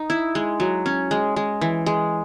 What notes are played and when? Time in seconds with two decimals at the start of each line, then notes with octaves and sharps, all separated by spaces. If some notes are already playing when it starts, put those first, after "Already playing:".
Already playing: D#4
0.10 E4
0.35 G#3
0.60 F#3
0.86 C#4
1.11 G#3
1.36 G#3
1.61 E3
1.86 G#3